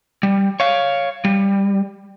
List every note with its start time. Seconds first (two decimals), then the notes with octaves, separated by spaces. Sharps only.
0.23 G3
0.60 C#5 F5
1.25 G3